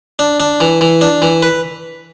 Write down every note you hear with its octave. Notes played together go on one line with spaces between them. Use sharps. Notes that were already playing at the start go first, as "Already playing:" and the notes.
D4
D4
E3
E3
D4
E3
B4